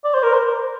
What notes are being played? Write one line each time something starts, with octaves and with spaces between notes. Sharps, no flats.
D5
C5
A#4
C5